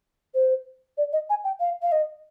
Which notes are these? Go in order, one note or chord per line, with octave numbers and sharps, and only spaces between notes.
C5
D5
D#5
G#5
G5
F5
F5
D#5